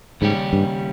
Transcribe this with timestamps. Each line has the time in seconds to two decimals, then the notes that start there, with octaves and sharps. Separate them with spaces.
0.21 D#2 G#2 C#3 G3 C#4 G4
0.53 G2